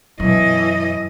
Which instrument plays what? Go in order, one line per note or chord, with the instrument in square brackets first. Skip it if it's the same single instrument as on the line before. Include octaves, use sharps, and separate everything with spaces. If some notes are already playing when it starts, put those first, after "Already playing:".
[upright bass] F#2 [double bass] B2 [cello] E3 D#5